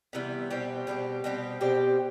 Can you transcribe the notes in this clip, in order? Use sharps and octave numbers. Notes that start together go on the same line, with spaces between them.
C3 E3 G3 B3
B2 G3 C4 G4
B2 G3 C4 G4
B2 G3 C4 G4
B2 G3 C4 G4